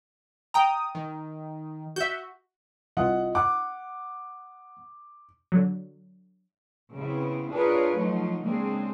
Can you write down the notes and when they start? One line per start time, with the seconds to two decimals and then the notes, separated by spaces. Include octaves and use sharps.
0.54 G5 A#5 D#6
0.95 D#3
1.96 F#4 E5 G6
2.97 C2 F4 D#5 F#5
3.35 F#5 D6
5.52 D3 F#3
6.95 C#3 B3 C4 E4
7.51 D4 F4 G#4 A#4 B4 C#5
7.96 F3 F#3 A3 D#4
8.42 C#3 G#3 A#3 C4 D4 G#4